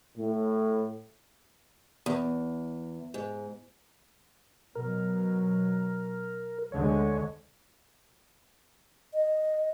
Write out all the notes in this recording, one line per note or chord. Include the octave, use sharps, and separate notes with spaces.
A2
E2
G#2
B2 F#3 A#4
D2 D3 G#3 C#5
D#5